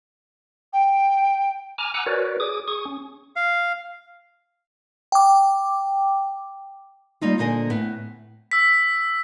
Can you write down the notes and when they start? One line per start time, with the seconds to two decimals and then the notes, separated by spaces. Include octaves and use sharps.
0.73 G5
1.78 G#5 A#5 D6 F6
1.94 F#5 G#5 A#5 D6 E6 F#6
2.06 F#4 A#4 B4 C#5 D5
2.40 G#4 D6 D#6
2.68 G#4 C#6 D#6
2.86 C#4
3.36 F5
5.12 G5 D6
7.21 G3 A#3 D#4 F4
7.38 A#2 D3 A#3 C5 D#5 G#5
7.70 A2 B3
8.52 E6 B6